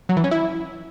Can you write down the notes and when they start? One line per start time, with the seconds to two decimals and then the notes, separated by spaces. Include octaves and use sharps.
0.09 F#3
0.17 E3
0.24 C#4
0.31 E4